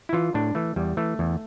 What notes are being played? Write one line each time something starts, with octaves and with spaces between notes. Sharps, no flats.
E4
E3 F4
A2 D4
E3 A3
E2 G3
E3 A3
E2